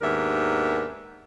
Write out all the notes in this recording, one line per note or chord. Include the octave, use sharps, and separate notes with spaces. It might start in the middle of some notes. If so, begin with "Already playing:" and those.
D#2 G#2 B3 D4 A#4 E5